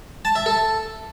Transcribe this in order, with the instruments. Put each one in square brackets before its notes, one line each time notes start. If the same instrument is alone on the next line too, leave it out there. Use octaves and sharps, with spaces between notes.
[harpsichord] A5
E5
A4